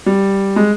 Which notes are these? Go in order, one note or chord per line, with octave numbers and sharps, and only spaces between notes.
G3
G#3